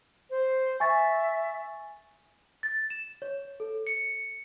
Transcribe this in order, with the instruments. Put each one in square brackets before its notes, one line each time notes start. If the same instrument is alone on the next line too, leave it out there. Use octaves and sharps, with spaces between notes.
[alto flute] C5
[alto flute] E5 [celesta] G#5 C#6 A6
[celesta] A6
E7
C#5
A4
C#7